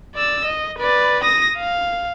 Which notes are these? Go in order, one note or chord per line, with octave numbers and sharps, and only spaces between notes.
D5 E6
D#5
B4 D5
D#6 A#6
F5